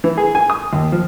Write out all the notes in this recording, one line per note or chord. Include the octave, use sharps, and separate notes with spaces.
E3
G#4
G#5
D#6
D#2
F3